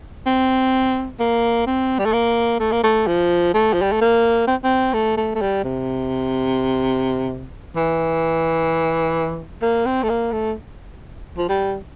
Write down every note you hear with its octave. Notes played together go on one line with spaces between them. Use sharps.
C4
A#3
C4
G3
A3
A#3
A3
A#3
A3
F3
A3
F3
G3
A3
A#3
C4
C4
A3
A3
A3
G3
C3
E3
A#3
C4
A3
A#3
A3
F3
G3